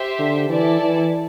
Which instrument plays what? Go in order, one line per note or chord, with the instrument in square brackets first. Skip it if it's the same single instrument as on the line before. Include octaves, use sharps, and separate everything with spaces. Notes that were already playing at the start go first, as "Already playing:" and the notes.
Already playing: [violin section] G4 C5 E5
[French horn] D3
[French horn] E3 [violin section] E4 A4 D5 A5
[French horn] E3